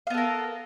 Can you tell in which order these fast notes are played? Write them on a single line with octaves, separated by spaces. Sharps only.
F5 B3 A4 A#4